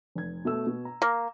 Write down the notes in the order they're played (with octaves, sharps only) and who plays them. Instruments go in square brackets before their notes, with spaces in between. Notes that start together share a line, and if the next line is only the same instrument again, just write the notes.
[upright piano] F1 G#6
B2 A3 E6
B2
A#5
[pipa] A#3